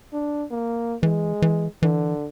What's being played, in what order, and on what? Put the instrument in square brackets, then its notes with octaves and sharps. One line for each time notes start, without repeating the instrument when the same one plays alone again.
[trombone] D4
A#3
[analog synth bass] E3 [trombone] G#3
[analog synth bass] E3
[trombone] D3 [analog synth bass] E3